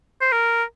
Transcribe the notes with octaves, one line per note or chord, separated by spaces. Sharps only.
C5
A#4